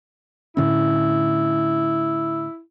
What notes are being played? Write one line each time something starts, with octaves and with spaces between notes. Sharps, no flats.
A2 D3 C#4 E4